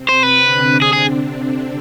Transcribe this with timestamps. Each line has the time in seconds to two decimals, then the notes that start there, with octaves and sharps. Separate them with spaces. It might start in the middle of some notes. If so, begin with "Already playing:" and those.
Already playing: C3 C4
0.09 C5
0.23 B4
0.38 D3 D4
0.82 G#4
0.93 G#4